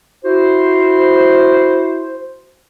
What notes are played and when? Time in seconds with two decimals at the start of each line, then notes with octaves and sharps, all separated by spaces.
0.24 E4 F#4 C5